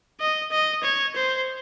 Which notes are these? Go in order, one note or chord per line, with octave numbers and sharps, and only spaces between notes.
D#5
D#5
C#5
C5